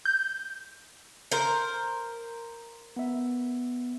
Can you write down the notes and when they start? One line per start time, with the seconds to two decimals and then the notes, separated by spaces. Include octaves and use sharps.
0.05 G6
1.31 A#4 C5
2.96 B3 E5